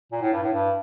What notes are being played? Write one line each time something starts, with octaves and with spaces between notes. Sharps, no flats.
A#2
A2
G2
A2
G2